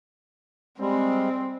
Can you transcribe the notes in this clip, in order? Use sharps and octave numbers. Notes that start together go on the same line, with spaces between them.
G3 G#3 C4